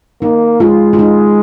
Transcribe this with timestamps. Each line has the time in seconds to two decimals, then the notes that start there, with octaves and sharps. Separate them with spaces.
0.22 A#3 D#4
0.60 G#3 F4
0.93 F4
0.99 D#4